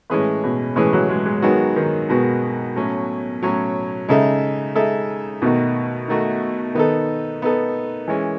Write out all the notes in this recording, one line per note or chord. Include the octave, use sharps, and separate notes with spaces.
A2 E3 G#3 C#4 G#4 B4
B2
A2 E3 G#3 C#4 G#4 B4
F#3
G#3
G#3
D#3 F#3 G#3 B3 F#4
D#3
B2 D#3 G#3 B3 F#4
A2 F#3 C#4
A2 F#3 C#4
C#3 G#3 D#4 A4 E5
G#3 D#4 A4 E5
B2 D#3 A3 D#4 F#4
D#3 A3 D#4 F#4
D#3 B3 D#4 A4
B3 D#4 A4
E3 G#3 C#4